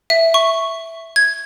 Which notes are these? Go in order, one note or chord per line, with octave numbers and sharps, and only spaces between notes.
E5
C#6
G#6